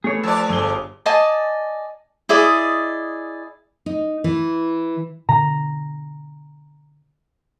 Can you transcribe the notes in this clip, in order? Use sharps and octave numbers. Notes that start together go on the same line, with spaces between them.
E3 A3 G#4 C#5
F3 D5 A5 E6
G1 G#4 A4 G7
D5 D#5 G#5 A5
E4 G#4 D5 D#5
D#4
E3
B2 D3 A#5